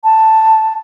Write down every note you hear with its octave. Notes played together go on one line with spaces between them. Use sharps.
A5